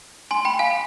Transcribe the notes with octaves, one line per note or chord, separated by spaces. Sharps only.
G#5 C6
G5 B5
F5 G#5